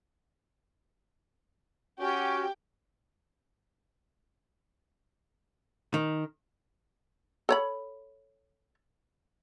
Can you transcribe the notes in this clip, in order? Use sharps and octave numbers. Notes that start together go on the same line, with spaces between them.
C#4 F#4 G4
D#3
A4 C#5 B5